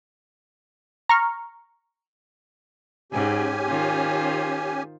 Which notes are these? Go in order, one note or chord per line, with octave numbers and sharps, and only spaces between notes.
A#5 C#6 F6
G#2 C#4 G4 G#5
D#3 F4 C5